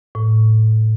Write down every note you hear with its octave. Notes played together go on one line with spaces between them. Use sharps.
A2